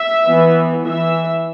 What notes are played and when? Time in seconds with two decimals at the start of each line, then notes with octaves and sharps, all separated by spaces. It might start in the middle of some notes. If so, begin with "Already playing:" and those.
Already playing: E5
0.26 E3 B3
0.86 E3 E5